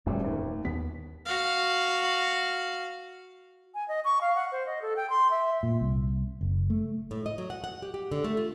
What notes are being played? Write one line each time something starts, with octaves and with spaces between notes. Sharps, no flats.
D1 A1 F2 G3 A3
D#2
D#2 B3 B6
F#4 F5
G#5
D#5
C#6
F5
F#5
C5
D#5
A4
G5
C6
E5
A#2
C2
F#1
A3
A2
D#5
F#3
F#5
F#5
G4
G4
D3
A3
F4